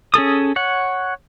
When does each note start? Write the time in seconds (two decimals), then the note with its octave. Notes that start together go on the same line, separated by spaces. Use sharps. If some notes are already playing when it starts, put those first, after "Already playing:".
0.14 C#4 G#4 A4 D#6
0.56 C#5 F#5